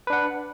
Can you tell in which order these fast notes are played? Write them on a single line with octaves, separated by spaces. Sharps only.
B4 D4 F#5